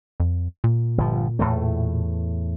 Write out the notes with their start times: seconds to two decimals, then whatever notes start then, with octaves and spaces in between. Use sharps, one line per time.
0.20 F2
0.64 A#2
0.98 G1 F3
1.39 E2 A2 A3